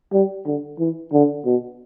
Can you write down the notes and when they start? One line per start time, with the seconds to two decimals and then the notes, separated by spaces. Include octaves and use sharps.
0.13 G3
0.46 D3
0.79 E3
1.12 D3
1.45 B2